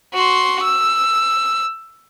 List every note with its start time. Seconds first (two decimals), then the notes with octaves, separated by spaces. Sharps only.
0.14 F#4 C6
0.63 E6